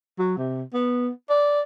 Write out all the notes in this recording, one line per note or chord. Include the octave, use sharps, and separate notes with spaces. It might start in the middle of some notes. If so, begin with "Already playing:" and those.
F#3
C3
B3
D5